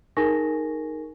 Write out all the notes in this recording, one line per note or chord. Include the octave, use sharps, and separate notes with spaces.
D#4 G#4 A#4 G#5 C#6 A#6